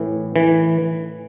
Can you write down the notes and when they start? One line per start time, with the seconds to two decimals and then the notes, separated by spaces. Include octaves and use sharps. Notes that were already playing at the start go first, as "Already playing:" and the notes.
Already playing: A2 E3
0.36 E3